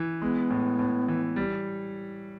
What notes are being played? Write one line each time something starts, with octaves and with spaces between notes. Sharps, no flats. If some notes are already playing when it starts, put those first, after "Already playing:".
Already playing: E3
G#3 B3
A2
A2
E3
G3